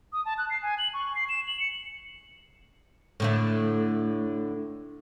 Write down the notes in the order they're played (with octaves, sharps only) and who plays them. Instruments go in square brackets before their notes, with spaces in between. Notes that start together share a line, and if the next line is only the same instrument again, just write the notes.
[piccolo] D#6
A5
F#6
C7
G#5
F#7
C#6
C7
E7
F#7
C#7
[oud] A2 D3 A3